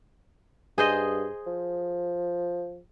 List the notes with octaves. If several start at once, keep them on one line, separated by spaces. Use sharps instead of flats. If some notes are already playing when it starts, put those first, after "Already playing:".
G2 G#4 C5 D#5
F3